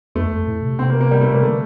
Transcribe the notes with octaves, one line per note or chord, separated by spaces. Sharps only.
F2 A3
F2
A2
C3
C3 C4
A#3
A#3
G3
A3
C3 A#3
D3 A3